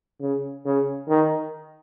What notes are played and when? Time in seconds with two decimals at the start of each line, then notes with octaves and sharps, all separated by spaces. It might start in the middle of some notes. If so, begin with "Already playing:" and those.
0.21 C#3
0.65 C#3
1.08 D#3